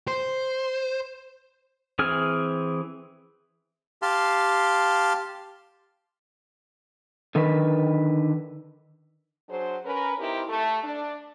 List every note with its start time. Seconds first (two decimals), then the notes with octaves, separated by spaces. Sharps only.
0.07 C5
1.99 E3 C4 G#4 G#5 F6
4.02 G4 F5 A5 C6
7.35 D3 D#3 A#4 B4
9.49 F#3 D4 G#4 C5
9.85 C#4 A#4 B4
10.18 C4 D#4 E4 G4 A#4
10.49 A3
10.84 D4